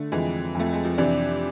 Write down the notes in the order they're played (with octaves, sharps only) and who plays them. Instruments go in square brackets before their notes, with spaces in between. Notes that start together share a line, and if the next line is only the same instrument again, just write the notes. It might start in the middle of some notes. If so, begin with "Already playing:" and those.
Already playing: [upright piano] D3 [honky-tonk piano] A3
[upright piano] F2 [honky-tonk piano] E3 G#3
[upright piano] F2 [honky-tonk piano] A3
[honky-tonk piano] G#3
F3
[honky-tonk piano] C3 E3 [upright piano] D4